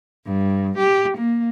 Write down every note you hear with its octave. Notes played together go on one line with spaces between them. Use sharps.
G2
G4
A#3